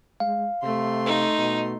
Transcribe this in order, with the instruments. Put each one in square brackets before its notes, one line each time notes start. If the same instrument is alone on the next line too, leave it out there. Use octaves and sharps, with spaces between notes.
[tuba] G#3 [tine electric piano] F5
[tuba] C3 [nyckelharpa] A3 C6
[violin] D#4
[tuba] B2